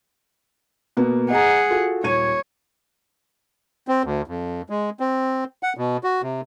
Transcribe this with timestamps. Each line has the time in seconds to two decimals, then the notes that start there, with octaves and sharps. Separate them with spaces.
0.97 B2 A#3 B3
1.30 G#4 D#5 F#5 A#5
1.70 F4 F#4 A4
2.04 D#1 C#5 G#6 D#7
3.88 C4
4.04 D2
4.27 F2
4.70 G#3
5.00 C4
5.63 F#5
5.77 B2
6.04 F#4
6.23 C3